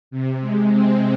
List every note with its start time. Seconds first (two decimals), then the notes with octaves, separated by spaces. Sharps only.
0.11 C3
0.41 G#3
0.69 C4